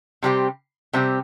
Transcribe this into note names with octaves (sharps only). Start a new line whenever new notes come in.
C3 G3 C4 G4
C3 G3 C4 G4